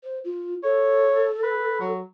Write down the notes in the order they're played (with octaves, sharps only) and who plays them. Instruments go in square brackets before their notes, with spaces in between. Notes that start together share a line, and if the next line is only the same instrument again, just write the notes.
[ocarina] C5
F4
[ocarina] A4 [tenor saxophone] C#5
[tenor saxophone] B4
F#3